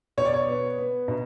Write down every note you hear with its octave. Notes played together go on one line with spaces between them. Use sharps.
B2 C#5
D5
C#5
B3
B3
B2